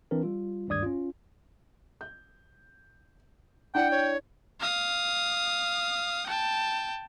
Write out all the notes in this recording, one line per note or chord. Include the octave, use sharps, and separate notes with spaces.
E3 C4 D4 A#4
G3 F4
G#1 D2 G2 D5 D#6 G#6
C#4 F4
G6
D4 E4 F#5 G5
C#5
F5 D#6
G5 A5